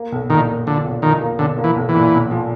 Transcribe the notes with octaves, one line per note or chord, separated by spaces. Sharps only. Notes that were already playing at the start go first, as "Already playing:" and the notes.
Already playing: A#3
B1
A#2 D#3
A#3
D3 F3
B1
D#3 F3
A#3
B1 D3
A#3
E3
B1
E3
A#2
B1
F3